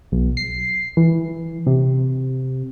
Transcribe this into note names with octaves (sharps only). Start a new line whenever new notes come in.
B1
C7
E3
C3